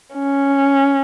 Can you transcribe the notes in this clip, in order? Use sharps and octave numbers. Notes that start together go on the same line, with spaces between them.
C#4